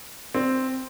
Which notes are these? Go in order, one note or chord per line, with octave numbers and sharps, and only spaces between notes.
C4